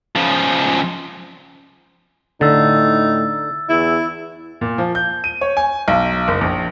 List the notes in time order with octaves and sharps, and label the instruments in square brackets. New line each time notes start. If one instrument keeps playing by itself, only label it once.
[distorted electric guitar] C#3 F3
[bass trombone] A2 [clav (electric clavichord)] D3 [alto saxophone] D#4 [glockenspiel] E6 A6
[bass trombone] E2 [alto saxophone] E4
[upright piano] A#2
F3
G6
D#7
C#5
G#5
B1
F#1
A#1